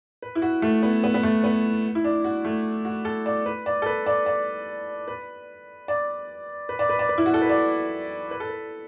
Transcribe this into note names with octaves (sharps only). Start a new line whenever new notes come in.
B4
E4
F#4
A3
B3
B3
B3
A3
B3
E4
D4
F#4
A3
F#4
A4
D5
B4
D5
A4
B4
D5
D5
B4
D5
B4
D5
B4
D5
B4
E4
F#4
A4
B4
D5
B4
A4
B4